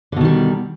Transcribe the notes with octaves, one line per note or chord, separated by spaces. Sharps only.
B2 D3 D#3 G3